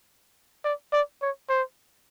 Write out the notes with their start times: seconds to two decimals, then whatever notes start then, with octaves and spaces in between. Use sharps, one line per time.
0.65 D5
0.93 D5
1.22 C#5
1.49 C5